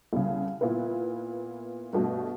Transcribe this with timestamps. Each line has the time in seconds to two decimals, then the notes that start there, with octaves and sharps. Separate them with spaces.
0.13 C2 C#3
0.61 A#2 B3 E4 B4
1.93 G2 B2 A3